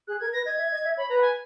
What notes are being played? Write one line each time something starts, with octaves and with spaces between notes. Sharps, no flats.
G#4 F#6
A#4 G#6
B4 A#6
D#5 G#6
E5
D#5
E5
C#5 B5
B4 A#5
F#5
G#5